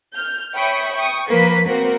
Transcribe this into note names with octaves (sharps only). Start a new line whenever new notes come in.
F6 G6
C#5 E5 G5 B5 C#6 D#6
G5 C#6 D#6
F3 A#3 B4 B6
A#3 C4 F#4 A#4